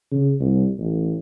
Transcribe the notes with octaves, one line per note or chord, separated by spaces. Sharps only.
C#3
C2
A1